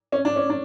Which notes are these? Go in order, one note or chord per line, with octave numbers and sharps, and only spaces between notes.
C#4
D4
C#4
D4